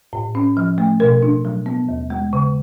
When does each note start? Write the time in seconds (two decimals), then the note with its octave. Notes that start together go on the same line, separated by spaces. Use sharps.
0.13 A2
0.35 C#4
0.57 F3
0.78 A3
1.00 B2 A#4
1.22 D4
1.45 F#3
1.66 B3
1.89 D#2
2.10 G#3
2.33 C#3